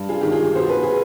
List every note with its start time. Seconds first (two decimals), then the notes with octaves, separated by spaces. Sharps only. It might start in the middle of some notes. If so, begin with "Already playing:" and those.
Already playing: G2
0.09 F4 G#4
0.21 D#3 G#3 G4
0.32 F4 G#4
0.55 B2 C5
0.69 B4
0.83 G#4